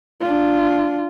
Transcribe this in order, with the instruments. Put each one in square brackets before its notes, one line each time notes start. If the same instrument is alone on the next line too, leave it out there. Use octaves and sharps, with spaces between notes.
[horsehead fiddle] D4 F4